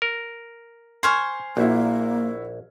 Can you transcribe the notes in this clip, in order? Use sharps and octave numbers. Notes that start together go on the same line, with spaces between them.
A#4
C5 G#5 C6 C#6 F6 G#6
A#1 A#3 E4 F#4